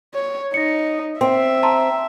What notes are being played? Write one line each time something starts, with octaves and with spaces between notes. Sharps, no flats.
C#5
D#4 A#6 C#7
C4 E5 C6
A5 A#5 C6